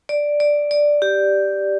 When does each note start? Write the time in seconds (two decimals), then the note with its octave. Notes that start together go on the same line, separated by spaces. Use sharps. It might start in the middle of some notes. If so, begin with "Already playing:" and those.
0.09 D5
0.40 D5
0.71 D5
1.02 G4